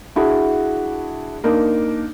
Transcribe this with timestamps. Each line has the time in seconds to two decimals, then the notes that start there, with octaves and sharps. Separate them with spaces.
0.16 D4 E4 F#4 G#4
1.44 A#3 D4 D#4 A#4